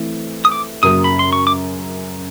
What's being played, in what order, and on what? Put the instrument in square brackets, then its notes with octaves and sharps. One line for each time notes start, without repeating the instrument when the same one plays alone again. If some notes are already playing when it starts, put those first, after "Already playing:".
Already playing: [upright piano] E3 A3 C4
[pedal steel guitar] D#6
D6
[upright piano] F#2 C#3 F#3 A#3 [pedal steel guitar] D#6
[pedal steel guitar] B5
C6
C#6
D6